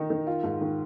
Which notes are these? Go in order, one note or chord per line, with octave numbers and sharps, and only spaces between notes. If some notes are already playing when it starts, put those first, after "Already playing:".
Already playing: D#3 D#4
D#3
F4
G#2
D#3